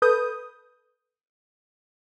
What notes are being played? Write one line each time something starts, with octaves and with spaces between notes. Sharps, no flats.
A4 B4 D#6 G6